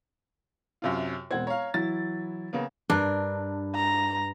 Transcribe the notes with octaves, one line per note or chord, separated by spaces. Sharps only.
F#2 C3 F4
E1 C4 F#5 G#6
C#5 F5 A#5
E3 F#3 E4 A6
C#3 A#3 B3
G2 D4 A#4
A#5